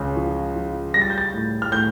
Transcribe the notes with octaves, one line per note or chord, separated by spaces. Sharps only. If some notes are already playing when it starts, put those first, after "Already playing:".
Already playing: C#2 C#3
F3
F3
G3 A#6
A6
G6
A6
A2
F6
A2 G6